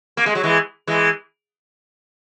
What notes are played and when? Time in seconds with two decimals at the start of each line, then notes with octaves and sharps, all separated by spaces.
0.17 A#3
0.26 G#3
0.35 F#3
0.43 E3 G#3
0.87 E3 G#3